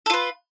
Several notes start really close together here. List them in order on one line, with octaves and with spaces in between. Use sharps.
A4 F4 B4